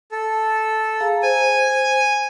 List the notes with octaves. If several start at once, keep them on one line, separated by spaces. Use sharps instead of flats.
A4
G#4 F5 A#5
C5 G#5